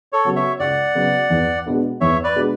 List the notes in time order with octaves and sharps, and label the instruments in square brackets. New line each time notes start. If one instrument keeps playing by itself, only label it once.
[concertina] A4 C#5
[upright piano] C#3 F#3 B3 F#4
[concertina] C#5 E5
[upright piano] C#2 [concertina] D5 F#5
[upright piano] C#3 F#3 B3 F#4
E2
B2 G#3 B3 D4
[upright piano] E2 [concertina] C#5 E5
[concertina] B4 D5
[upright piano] B2 G#3 B3 D4